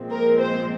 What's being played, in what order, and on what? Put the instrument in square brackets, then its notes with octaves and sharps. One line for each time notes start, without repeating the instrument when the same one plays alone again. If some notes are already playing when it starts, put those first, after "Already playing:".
Already playing: [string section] A#2 F3 G#3 C4
A#4
C5